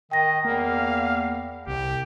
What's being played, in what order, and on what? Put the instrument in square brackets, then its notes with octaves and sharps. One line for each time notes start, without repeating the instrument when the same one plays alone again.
[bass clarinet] D#3 [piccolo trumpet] D#5 [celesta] G5 A#6
[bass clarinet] E2 [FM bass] A#3 [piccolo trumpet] F5
[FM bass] C2 [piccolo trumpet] G4